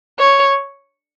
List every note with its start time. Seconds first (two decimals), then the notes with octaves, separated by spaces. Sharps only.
0.19 C#5